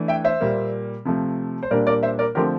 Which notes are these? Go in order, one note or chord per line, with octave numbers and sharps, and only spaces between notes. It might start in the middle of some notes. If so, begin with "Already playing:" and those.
Already playing: E3 A3 D4
E5 G5
C5 E5
A#2 G3 A#3
C3 F3 A3
C5
A#2 G3 A#3 D4 A#4 D5
A#4 D5
C5 E5
A#4 D5
D3 F3 A3 C4 G4 A#4